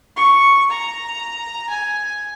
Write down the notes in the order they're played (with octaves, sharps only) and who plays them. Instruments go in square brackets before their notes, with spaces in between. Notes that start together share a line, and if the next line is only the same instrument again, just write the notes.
[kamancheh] C#6
A#5
G#5